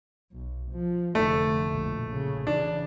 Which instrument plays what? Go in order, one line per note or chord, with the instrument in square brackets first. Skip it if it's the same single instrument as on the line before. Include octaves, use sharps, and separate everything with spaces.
[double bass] B1
F3
[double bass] F1 D3 [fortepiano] A3
[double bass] A#1 B2
C#3
[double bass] C#3 E3 [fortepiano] D4